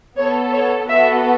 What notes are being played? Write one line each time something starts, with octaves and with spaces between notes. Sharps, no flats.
B3 A4 C#5
C#5
B3 F#4 A4 E5